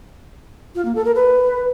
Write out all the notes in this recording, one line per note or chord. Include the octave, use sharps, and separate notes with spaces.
F4
A#3
A4
A#4
B4